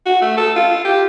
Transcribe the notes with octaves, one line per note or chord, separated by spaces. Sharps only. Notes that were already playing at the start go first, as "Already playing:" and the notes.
F#4
A3
A4
F4
G4